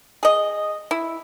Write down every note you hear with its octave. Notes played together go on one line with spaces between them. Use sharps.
G#4 D#5
E4